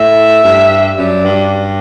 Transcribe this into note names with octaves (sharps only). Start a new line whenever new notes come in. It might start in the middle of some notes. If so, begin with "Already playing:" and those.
Already playing: A2 E5
G2
F#2 D5
G2